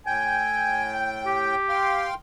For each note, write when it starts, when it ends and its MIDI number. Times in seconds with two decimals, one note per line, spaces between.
0.07 1.55 45
0.07 1.55 79
0.07 0.95 80
0.07 1.55 91
1.26 2.07 67
1.69 2.14 77
1.69 2.14 79
1.69 2.14 84